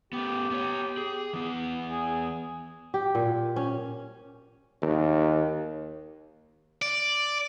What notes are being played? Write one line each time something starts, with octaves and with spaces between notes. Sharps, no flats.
A3 B3 G4
B3 C#5
G#4
E3 B3
G#4
G4
A#2
C#4
D#2
D5